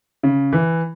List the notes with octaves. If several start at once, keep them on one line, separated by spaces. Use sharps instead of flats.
C#3
E3